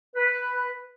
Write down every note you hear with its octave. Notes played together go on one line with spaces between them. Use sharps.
B4